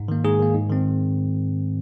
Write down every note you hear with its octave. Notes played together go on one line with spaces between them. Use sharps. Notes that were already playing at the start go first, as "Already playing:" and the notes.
Already playing: G#2
D#3 A#3
G#2 G#4
D#3 A#3
G#2
D#3 C4